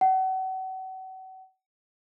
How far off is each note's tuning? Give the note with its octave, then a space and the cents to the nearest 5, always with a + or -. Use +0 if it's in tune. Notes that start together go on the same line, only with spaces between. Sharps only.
F#5 +35